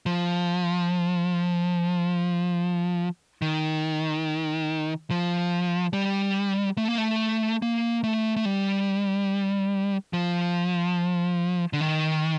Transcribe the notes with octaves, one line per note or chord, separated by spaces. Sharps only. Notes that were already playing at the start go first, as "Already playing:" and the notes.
F3
D#3
F3
G3
A3
A#3
A3
A#3
A3
A3
G3
F3
D3
D#3